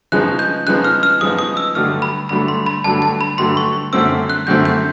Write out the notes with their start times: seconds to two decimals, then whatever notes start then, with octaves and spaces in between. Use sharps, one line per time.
0.12 C#3 F3 G#3 B3 D#4 F#6
0.39 G6
0.67 C#3 F3 G#3 B3 D#4 F#6
0.84 F6
1.03 F6
1.21 C#3 F3 G#3 B3 D#4 D#6
1.39 D#6
1.57 E6
1.75 G2 D3 F#3 A3 F6
2.02 B5
2.29 G2 D3 F#3 A3 B5
2.48 C6
2.66 B5
2.84 G2 D3 F#3 A3 A5
3.02 A5
3.21 B5
3.38 G2 D3 F#3 A3 C6
3.57 C#6
3.93 F#2 D3 F#3 A3 C4 E6
4.30 F#6
4.47 F#2 D3 F#3 A3 C4 G6
4.65 G6